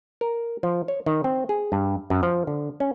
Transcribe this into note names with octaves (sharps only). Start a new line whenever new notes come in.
A#4
F3
C#5
D#3
C4
G#4
G2
F#2
F3
D3
C#4